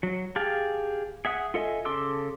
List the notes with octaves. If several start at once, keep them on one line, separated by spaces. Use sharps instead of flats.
F#3
G4 G#4 F5 A5
G#4 E5 F#5 D#6
F4 A4 D#5 E5 G#5
C#3 A4 C6 D6 E6